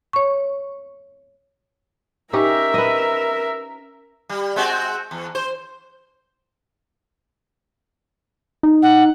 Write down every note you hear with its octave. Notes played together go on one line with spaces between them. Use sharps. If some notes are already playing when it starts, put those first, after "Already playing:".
C#5 C#6
C#4 D#4 G4 A#4 E5
B4 D#5
G3
G#3 C4 F#4
E2
C5
D#4
F#5